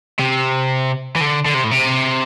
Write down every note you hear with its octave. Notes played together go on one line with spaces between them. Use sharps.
C3
E3
D3
D3
C3
A2
C3